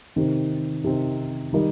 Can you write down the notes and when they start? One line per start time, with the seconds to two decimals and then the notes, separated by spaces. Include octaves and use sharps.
0.16 C3 D#3 C4 D#4
0.84 C3 D#3 C4 D#4
1.53 D#3 G3 D#4 A#4